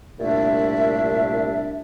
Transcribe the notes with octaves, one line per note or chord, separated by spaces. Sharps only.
C2 A#2 A3 D4 E5